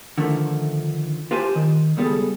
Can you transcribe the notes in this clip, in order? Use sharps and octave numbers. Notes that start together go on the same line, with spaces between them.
D3 D#3 F3 A3
F4 G4 B4 C5 G#5 A5
D#3
C#2 G3 B3 G#4 A4